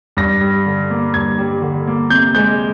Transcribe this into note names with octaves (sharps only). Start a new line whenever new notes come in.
G2 A#6
G3
D3
A#3
G2 G#6
G3
D3
A#3
C3 G6
G#3 G6